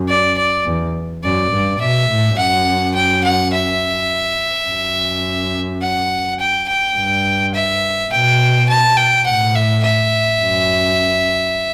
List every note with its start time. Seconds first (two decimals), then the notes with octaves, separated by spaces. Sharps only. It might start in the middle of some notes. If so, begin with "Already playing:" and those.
Already playing: F#2
0.08 D5
0.37 D5
0.66 E2
1.23 F#2 D5
1.52 G2
1.80 B2 E5
2.09 A2
2.38 F#2 F#5
2.95 G5
3.24 F#5
3.53 E5
4.67 F#2
5.82 F#5
6.39 G5
6.68 G5
6.96 G2
7.54 E5
8.11 B2 G5
8.69 A5
8.97 G5
9.26 A2 F#5
9.55 E5
9.84 E5
10.40 F#2